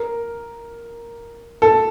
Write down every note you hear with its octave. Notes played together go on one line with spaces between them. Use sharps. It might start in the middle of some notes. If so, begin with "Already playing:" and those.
Already playing: A#4
A4